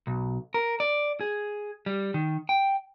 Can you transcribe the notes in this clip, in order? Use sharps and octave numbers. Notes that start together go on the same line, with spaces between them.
B1
A#4
D5
G#4
G3
D#3
G5